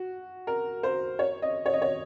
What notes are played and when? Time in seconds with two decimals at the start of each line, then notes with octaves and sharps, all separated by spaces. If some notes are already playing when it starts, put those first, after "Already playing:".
Already playing: F#4
0.47 A#4
0.83 C5
1.19 C#5
1.42 D#5
1.66 C#5
1.73 D#5
1.82 C#5